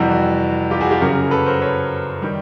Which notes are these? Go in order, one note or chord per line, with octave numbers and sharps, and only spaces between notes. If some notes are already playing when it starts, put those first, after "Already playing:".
Already playing: F2 C3 E3 G3 F#4
F#4
F4 G4
F#4 G#4
F4 G4
F#2 C#3 F#3 G#4 A#4
A4 B4
A#4 C5
B4 C#5
D#3 G3